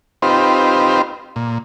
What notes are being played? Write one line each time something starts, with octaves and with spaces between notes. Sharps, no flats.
C4 D#4 F4 G4 B4 C5
A#2